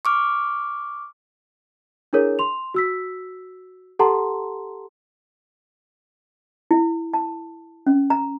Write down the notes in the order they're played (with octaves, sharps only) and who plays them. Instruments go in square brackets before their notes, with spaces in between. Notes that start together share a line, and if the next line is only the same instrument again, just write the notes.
[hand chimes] C#6 D6 F6
[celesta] D4 E4 G#4 A#4 C#5
C6 F7
F#4 E6 B6
G4 A4 F#5 A5 A#5 C6
[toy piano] E4
A5
C#4
A#5